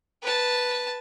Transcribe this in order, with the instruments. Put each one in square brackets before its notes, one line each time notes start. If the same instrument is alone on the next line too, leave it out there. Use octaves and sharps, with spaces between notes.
[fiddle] B4 A5